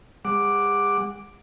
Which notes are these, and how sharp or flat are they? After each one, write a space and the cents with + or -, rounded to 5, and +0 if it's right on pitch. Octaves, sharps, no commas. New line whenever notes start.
G#3 -40 F#5 +0 D6 +0